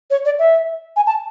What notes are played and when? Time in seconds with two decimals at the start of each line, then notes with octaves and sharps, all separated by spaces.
0.10 C#5
0.25 D5
0.39 E5
0.96 G#5
1.07 A5